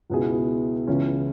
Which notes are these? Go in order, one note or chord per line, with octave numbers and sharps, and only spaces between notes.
C#2 B2 B3 E4 G#4
C#2 C#3 E3 C#4 E4